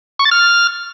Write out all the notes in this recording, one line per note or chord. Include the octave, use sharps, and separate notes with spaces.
C#6
A6
F6